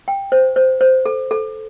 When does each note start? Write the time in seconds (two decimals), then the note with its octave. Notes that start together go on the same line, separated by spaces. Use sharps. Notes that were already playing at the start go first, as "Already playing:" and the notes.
0.08 G5
0.32 C5
0.56 C5
0.81 C5
1.06 A4
1.31 A4